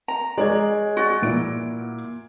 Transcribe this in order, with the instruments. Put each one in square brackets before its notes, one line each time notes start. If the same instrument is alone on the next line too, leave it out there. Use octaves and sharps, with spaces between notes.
[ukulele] A#5
[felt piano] G#3 C#5 G#6 [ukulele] D5
[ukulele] F#4 D5
[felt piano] A#2 E4 D7